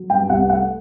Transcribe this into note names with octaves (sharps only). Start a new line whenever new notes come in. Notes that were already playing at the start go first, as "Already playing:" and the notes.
Already playing: F#3
G2 G5
C2 F#5
A3 F#5